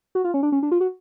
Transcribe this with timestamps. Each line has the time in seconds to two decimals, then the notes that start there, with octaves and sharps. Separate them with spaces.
0.15 F#4
0.24 F4
0.34 C#4
0.43 D4
0.52 C#4
0.63 D4
0.72 F4
0.80 F#4